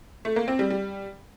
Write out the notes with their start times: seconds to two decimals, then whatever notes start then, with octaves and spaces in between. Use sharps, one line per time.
0.25 A3
0.36 A#3
0.48 C4
0.59 G3
0.70 G3